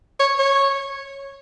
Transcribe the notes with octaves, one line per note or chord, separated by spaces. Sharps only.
C#5
C#5